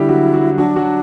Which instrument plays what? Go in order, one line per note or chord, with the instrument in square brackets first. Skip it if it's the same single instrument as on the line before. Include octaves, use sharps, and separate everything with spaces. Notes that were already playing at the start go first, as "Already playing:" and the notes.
Already playing: [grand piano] D3 G3 D4 G4 [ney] E4
[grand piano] F#3 F#4
F#3 F#4
[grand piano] F#3 F#4 [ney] D4
[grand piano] F#3 F#4